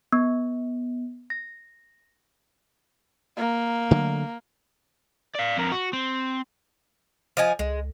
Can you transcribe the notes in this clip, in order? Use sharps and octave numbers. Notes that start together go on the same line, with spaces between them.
B3
A#6
A#3
D3 F#3 A3
D5 F5
F2 A#4
F#4
C4
F3 D#5 G#5
C#2 G#3